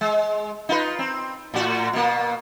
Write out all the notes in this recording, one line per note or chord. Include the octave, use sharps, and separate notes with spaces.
G#3
D#4 F4 B4
C4
A2 F#4
B2 A#3